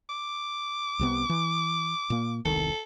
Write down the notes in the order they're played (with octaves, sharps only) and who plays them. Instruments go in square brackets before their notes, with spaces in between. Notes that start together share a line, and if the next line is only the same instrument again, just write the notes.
[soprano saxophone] D6
[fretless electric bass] C2 C3 B3
E3
A#2 A#3
[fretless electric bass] E1 C2 D#3 [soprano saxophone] A4